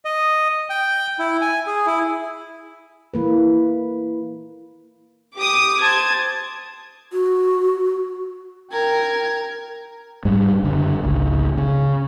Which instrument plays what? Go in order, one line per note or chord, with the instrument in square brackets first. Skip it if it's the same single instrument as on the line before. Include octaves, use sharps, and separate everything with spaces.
[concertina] D#5
G5
E4
G#5
G#4
E4
[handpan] E3 A#3 B4
[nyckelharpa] G4 [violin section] D6 D#6
[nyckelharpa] C5 A5 [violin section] G#6
[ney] F#4
[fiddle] A#4 [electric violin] G5 G#6
[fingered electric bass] G#2 G3
F#1 D3
G#1 C#2
C#3